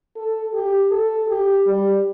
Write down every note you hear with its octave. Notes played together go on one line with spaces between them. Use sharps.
A4
G4
A4
G4
G3